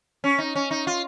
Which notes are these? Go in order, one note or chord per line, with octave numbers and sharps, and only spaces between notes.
C#4
D#4
C#4
D#4
F4